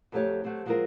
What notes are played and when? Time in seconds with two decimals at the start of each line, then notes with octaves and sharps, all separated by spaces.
0.12 F2 F#3 A3 D#4 G4 C#5
0.44 F#3 A3 C4 G4
0.65 F3 F#3 G#3 C4 F4 A#4